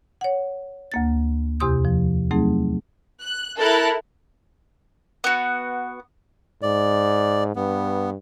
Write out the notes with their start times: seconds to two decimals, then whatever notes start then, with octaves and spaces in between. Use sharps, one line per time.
0.21 C#5 F#5
0.92 D2 A#3 A6
1.60 E2 C3 G4 C6 D#6 G6
1.85 F3
2.31 F#3 A3 C4 D#4 G#4
3.23 F#6
3.58 E4 A4 A#4 A5 F#6
5.24 B3 F#4
6.63 G#2 D5
7.56 G2 B3